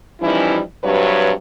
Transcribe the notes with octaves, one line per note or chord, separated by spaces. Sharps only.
E3 F3 G3 C#4 D#4 E4
G2 C3 F#3 B4 C#5